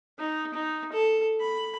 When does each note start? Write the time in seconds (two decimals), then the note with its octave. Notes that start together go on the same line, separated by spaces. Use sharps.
0.19 D#4
0.54 D#4
0.92 A4
1.41 B5